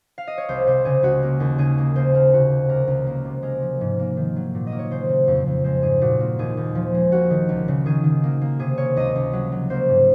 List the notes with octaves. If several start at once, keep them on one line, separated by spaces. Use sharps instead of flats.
F5
D#5
C#5
C2 C5
C3 C5
C#3 G#4
C#2 F#4
A#3
D#2
C#3 G#4
A#3
A#3 C5
A#3 A#4
C3 F#4
C3
C#2 A#4
C#2
A#3
C3
G#3 A#4
F3
G#2
A#3
D#3
F#3
A#2
D#5
A#3
C#5
C#3 C5
C#3
F2
F2
G#3 C5
G#2 G#4
A#2 F#4
A#3
D#2 G#4
D#2
F3
G#3
A#3 F#4
D#3
C#2
C#3
D#3 G#4
D#3
A#3
A#3
C3 G#4
A#3 C#5
C#2 D#5
C#2
F#3
F#3
A#3 C5
G#2